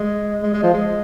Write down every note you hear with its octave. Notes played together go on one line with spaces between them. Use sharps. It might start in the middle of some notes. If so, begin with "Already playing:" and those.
Already playing: G#3
G#3
G#3
F3
G#3